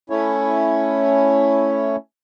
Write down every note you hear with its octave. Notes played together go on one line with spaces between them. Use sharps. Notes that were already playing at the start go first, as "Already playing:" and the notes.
A3 C#4 E4 C#5